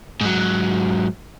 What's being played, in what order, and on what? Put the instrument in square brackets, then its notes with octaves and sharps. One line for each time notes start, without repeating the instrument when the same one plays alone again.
[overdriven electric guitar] G#2 F#3